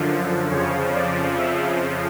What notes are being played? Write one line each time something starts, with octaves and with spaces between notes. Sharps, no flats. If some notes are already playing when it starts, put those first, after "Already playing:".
Already playing: F#2 D3 F3
F2 C#3 F3 C#5
D5
E5